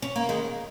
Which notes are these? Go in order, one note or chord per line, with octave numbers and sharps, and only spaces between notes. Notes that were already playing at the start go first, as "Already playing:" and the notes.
C#4
A#3
D#3 G#3